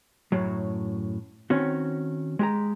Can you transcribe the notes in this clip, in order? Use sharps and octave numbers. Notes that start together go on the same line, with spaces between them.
F#2 A2 F#3
D#3 C4 C#4 F#4
G#3 G4 A#5